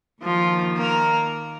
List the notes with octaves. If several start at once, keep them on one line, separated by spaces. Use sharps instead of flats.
D#2 D#3 F3 F4
A#3 A#4